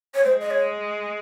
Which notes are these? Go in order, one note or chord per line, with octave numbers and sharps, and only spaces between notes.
C#5
G#3 C5
D#5
C#5